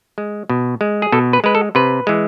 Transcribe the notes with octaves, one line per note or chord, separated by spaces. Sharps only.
G#3
B2
G#3
G#4
B2 A4
B4
G#3 B4
A4
C3 B4
E3 G#3